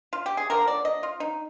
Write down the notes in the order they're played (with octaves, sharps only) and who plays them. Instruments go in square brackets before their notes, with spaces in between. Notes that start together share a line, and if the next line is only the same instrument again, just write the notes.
[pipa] F4
G4
G#4
D3 F3 A#3 A#4
D5
D#5
F4
D#4